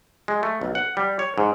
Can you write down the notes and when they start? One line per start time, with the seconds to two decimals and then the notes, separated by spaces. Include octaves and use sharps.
0.28 G#3
0.43 A3
0.61 B1
0.75 F#5
0.97 G3
1.19 C#5
1.38 G#2